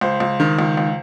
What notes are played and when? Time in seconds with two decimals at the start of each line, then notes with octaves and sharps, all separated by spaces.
0.01 C#2 C5
0.20 C#2
0.40 D#3
0.59 C#2
0.77 C#2